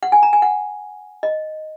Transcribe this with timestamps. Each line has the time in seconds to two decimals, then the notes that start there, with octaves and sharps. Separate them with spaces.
0.03 F#5
0.12 G#5
0.23 A#5
0.33 G#5
0.42 F#5
1.23 D#5